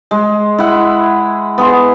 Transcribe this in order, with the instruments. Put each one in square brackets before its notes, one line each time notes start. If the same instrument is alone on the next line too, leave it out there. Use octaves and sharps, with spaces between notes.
[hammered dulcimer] G#3
E4 F#5
B3 G#4 C6